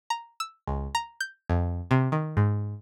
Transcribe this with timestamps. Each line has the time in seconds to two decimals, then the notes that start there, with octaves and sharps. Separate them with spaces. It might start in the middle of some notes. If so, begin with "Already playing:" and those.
0.10 A#5
0.40 E6
0.67 C#2
0.95 A#5
1.20 G6
1.49 F2
1.91 C3
2.12 D#3
2.37 G#2